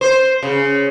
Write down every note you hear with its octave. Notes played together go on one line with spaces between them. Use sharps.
C5
C#3